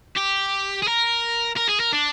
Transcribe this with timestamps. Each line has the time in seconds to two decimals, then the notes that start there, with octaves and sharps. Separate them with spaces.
0.17 G4
0.82 G#4
0.88 A#4
1.57 A#4
1.69 G#4
1.80 A#4
1.93 D4